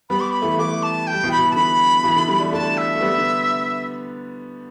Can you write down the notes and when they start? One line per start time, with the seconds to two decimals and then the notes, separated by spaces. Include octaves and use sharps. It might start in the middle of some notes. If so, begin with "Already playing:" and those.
0.10 G3 B3 B5
0.21 D6
0.31 B5
0.42 E3 A3
0.58 E3 A3 D6
0.83 A5
1.07 G5
1.12 G3
1.23 B2 E3
1.31 B5
1.39 B2
1.51 A5
1.55 D3 B5
2.04 B2 E3
2.16 D3
2.28 D3 G3
2.40 A3 D4
2.52 A3 D4 A5
2.77 E5
2.95 A3
3.01 G3 B3
3.18 D3